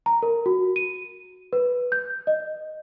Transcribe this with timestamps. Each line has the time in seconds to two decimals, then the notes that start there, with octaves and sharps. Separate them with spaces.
0.06 A#5
0.23 A#4
0.46 F#4
0.76 D#7
1.53 B4
1.92 G6
2.27 D#5